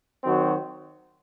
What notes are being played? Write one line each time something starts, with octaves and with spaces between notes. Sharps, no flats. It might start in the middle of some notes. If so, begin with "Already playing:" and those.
D#3 F#3 C4 F#4